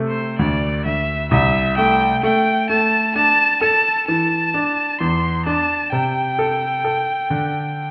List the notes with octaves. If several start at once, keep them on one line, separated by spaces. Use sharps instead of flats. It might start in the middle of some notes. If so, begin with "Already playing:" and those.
Already playing: C3 A3
C5
D2 D5
D2 E5
C2 E5
A3 G5
A3 G5
A3 A5
D4 A5
A4 A5
E3 A5
D4
E2 C6
D4 A5
C3 G5
A4
A4
D3